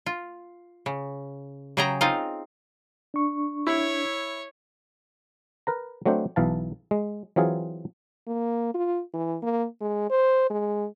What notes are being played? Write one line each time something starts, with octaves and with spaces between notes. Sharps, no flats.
F4
C#3
C#3 F#3 G#4 G5 A5 A#5
C4 D#4 F4 D#5 F5
D4 C#6
E4 C#5
A#4 B4 A#5
F#3 A3 C4 D4 C5
B1 E3 F5 A5
G#3
E3 F#3 C4 F4 G#4
A#3
F4
E3
A#3
G#3
C5
G#3